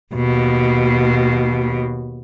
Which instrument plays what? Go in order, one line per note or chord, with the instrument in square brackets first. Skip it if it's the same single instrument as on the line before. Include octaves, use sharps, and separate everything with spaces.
[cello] D#2 B2